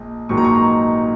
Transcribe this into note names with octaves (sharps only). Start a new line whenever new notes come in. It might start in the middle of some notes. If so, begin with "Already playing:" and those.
Already playing: A#1 G#3
A#1 G#2 D#3 F#3 C#6
A#5
C#6
A#5